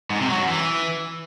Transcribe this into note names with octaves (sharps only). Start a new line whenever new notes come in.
G#2
C3
F#3
F#2
E3